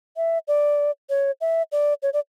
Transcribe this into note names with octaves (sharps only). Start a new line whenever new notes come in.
E5
D5
C#5
E5
D5
C#5
D5